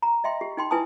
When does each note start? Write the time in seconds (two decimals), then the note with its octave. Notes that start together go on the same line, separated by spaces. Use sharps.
0.02 A#5
0.24 D#5 E5 G5 C6
0.41 G4
0.57 D#4 G5 C6
0.71 E4 B4 G#5 A5 D#6